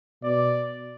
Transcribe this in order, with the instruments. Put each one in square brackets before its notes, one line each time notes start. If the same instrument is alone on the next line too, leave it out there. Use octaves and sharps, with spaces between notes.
[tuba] B2 [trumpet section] D5